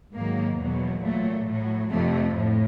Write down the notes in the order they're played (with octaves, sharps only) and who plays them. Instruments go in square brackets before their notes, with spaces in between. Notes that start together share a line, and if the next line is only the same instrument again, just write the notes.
[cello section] G#2 D#3 F#3 A#3
E2 B2 F#3
A#2 F#3 A3
A2 F#3
F2 C3 F3 A3
A2